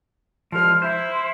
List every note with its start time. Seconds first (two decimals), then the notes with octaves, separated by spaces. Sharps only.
0.52 C2 F3 G#3 F6
0.82 E4 C5